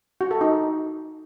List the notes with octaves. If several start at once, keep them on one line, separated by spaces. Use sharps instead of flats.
F#4
A4
D#4